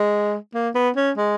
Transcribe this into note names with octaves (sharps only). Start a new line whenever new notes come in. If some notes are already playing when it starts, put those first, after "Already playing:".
Already playing: G#3
A#3
B3
C#4
G#3